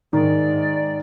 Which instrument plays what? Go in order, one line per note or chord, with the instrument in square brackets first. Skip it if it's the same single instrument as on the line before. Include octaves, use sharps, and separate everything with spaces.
[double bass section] G#2 [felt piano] D#3 [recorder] D5